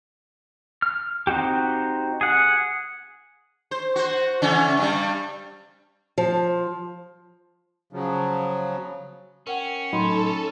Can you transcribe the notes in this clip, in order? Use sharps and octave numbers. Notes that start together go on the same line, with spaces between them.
F6
C4 D#4 F#4 G4
G#4 F#5
C5
F#4 C5
C#3 E3 C#4
G2 G3
F3
C#3 F3 F#3
C#4 A#4 F#5 G5
A2 F#3 D#4 A4 B5 C6